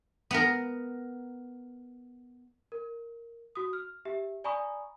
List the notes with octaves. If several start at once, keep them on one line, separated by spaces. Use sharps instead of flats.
B3 A#4
A#4
F#4 D#6
F6
G4 E5
D5 G#5 A#5 B5 C#6 D#6